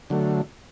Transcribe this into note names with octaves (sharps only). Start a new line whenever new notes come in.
D3 F#3 A3